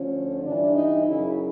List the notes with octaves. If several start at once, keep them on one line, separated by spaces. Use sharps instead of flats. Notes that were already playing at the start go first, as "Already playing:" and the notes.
Already playing: D2 D3 F3 C#4
G2 E3 G3 D4
D#4
F#2 C#3 F#3 E4